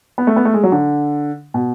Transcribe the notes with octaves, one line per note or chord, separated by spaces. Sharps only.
B3
A3
B3
A3
G#3
F#3
D3
B2